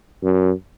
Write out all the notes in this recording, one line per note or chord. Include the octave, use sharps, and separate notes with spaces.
F#2